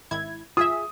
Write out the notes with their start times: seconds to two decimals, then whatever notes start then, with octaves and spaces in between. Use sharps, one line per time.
0.11 G#1 E4 G#6
0.57 F4 G#4 E5 D#6